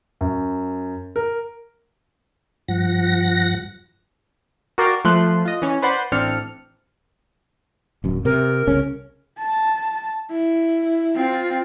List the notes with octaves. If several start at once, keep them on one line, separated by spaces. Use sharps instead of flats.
F#2
A#4
G2 F3 F#5 A#6
F#4 A#4 D5 F5 G5
F3 A3 C6 F#6
F4 D#5
E3 C#4
B4 C5 D5 F#5 B5 C6
A1 C4 D4 F6 C#7
D1 F#2
C3 A#4
C2 C#3 C#4
A5
E4
C4 F4